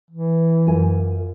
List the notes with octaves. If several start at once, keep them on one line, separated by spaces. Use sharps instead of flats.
E3
F#2 F4 G#5